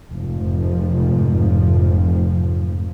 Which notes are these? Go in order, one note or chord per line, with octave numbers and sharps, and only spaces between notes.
F1 G#2 F3